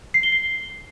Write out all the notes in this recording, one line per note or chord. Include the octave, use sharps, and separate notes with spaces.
C7
G7
C7